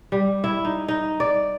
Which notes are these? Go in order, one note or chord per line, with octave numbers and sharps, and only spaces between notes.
G3
E4
D#4
D#4
D5